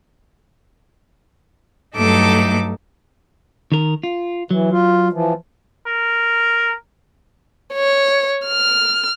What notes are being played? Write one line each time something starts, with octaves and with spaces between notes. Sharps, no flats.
G2 F#3 A3 D#4 A4 D6
D#3 A#4
F4
E3 F#3
F4
E3 F3
A#4
C#5
F6